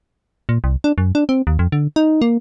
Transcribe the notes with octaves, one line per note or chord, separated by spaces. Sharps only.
A#2
C2
D4
F#2
D4
C4
D#2
F2
D3
D#4
A#3